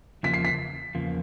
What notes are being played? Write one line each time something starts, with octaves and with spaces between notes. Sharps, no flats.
E2 C#3 F3 A#3 B6
C7
B6
E2 C#3 F3 A#3